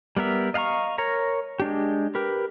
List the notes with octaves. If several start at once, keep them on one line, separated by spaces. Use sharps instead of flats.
G3 B3 A#4 E5
D#5 F5 F#5 A#5 C#6
A#4 C#5 A#5
G#3 D4 G4
G4 A#4 B4